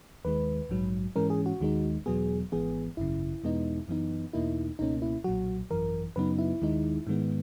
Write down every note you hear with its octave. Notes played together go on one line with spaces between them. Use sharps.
D#2 D#3 G#3 B4
A#1 G#2 F#3
G#2 E3 G#3 C#4 A#4
G#4
F#4
D#2 D#3 G#3 D#4
E2 B2 F#3 B3 G#4
G#1 G#2 E3 B3 G#4
G#1 F#2 C#3 E4
E2 B2 G#3 B3 D#4
F#2 E3 B3 D#4
E2 B2 A#3 D#4 E4
C#2 B2 A#3 C#4 D#4
E4
B1 A#2 F#3 F#4
G#1 F#2 E3 A#4
F#2 C#3 F#3 B3 D#4 B4
E4
D#2 D#3 G#3 D#4
G#2 D#3 G#3 B3